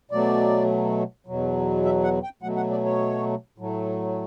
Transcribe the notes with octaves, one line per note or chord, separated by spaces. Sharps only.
B2 F#3 A3 D5
E2 B2 F#3
E5
F#5
G5
B2 F#3 A3 F#5
F#5
D5
C#5
A2 F#3 A3